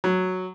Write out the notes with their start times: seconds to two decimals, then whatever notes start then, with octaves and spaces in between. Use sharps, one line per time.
0.04 F#3